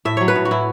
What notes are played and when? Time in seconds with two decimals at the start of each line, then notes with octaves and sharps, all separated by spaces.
0.05 A2 E5
0.17 F#3 C#5
0.28 B4
0.36 A2
0.45 F#4
0.51 A2 E4